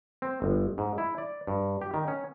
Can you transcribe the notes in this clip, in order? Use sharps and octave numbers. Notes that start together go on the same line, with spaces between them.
C4
G1
G#2
E4
D5
G2
G4
D#3
C#4